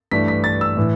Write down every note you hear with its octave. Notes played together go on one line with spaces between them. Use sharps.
G2 E3 A3 D4 B6
B6
A6
E6
A2 E3